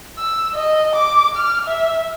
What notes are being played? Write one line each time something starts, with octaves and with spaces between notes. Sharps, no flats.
E6
D#5
D6
F6
E5